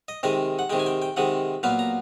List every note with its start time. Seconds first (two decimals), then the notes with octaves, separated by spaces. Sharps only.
0.08 D#5
0.23 C3 D#3 G#3 D#5
0.59 F#5
0.70 C3 D#3 G#3 G5
0.79 G#5
0.86 G5
1.02 G5
1.17 C3 D#3 G#3 F#5
1.63 A#2 F#3 B3 F5
1.79 A#5